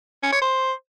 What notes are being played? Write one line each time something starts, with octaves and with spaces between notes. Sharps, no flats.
C#4
C#5
C5